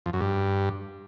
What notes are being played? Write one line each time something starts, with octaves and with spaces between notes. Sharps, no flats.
F2
F#2
G2